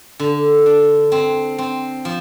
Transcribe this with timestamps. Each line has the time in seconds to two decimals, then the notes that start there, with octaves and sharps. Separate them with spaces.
0.19 D3
0.66 D4
1.12 C4
1.58 C4
2.05 F3